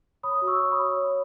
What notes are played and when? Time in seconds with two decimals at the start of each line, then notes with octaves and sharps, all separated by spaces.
0.23 C#5 B5 D#6
0.42 F#4
0.47 C#6 E6
0.60 C#5
0.72 B5 D#6
0.78 C#5
0.97 C#5